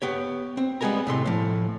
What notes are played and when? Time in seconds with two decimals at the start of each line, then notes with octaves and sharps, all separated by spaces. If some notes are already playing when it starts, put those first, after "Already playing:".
0.02 B3 G4 C#5
0.57 C4
0.81 G3 G#3 B3 G#4 A#4 A#5
1.07 A2 C3 C6
1.26 A2 F3